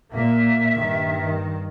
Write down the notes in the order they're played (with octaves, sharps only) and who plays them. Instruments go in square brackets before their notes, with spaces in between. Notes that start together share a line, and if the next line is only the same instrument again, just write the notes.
[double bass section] A#2 A#3 [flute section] E5
[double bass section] G2 D#3